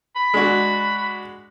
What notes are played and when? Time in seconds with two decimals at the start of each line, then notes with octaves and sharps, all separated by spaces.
0.16 B5
0.34 G#3 D4 F#4